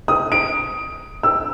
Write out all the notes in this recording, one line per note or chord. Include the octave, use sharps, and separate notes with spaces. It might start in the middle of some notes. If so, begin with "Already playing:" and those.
D#6
D7
E6